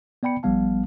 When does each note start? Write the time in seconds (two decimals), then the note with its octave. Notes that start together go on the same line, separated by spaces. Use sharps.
0.23 B3 D5 G5 B5 C#7
0.43 A1 F3 G3 B3 F5 A5